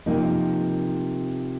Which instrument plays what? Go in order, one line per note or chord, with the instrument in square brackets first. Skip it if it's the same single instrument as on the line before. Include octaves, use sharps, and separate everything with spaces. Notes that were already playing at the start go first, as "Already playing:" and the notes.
[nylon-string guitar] C3 F3 A#3 D#4